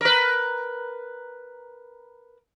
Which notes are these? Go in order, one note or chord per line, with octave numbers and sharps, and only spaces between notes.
A#4 B4